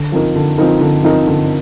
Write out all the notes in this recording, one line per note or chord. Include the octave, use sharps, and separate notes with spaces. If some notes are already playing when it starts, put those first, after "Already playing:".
Already playing: D3
F3 C4 D#4 A#4
D3
F3 C4 D#4 A#4
D3
F3 C4 D#4 A#4
D3